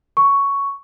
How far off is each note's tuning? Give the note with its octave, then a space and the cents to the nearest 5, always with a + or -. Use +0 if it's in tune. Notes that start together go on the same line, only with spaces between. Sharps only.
C#6 +5